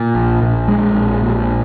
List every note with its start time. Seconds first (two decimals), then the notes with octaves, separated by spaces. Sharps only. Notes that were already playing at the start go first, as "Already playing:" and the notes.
Already playing: A#2
0.15 A#1
0.42 A#1
0.68 G#3
0.94 A#1
1.21 A#2